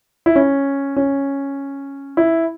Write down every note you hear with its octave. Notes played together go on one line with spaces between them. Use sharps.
E4
C#4
C#4
E4